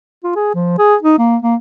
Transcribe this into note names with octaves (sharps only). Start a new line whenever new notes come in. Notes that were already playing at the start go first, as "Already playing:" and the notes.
F4
G#4
F3
G#4
D#4
A#3
A#3